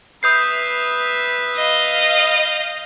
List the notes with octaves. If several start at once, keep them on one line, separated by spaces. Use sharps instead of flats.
B4 E5 D#6 G6 C7
D#5 F5